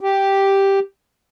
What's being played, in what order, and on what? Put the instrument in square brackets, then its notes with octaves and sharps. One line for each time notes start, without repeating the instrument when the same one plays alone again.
[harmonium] G4